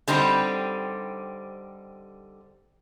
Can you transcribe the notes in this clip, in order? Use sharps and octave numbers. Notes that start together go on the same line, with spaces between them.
D3 G3 C4 D#4 G4